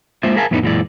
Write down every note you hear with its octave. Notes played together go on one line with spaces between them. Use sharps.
G#3 A#3 D4 F4 C5 E5
G#4 A#4 E5 F5 G#5 A5
F2 A2 A3 B3 C4 D#4
F#2 A#2 E3 G#3 E4 D5